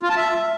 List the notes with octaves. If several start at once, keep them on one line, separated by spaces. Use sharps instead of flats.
F4
A5
E5